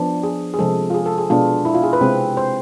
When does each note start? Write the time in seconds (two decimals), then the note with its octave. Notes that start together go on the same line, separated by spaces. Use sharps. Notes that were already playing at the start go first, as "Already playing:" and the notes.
Already playing: F3 B3 D4
0.23 G#4
0.54 G#4
0.59 C3 F3 G#3 A4
0.90 F4
0.94 G#4
1.06 A4
1.18 G#4
1.30 B2 G#3 B3 D4 F4
1.65 E4
1.75 F4
1.83 G#4
1.93 B4
2.01 C3 G#3 C4
2.37 C5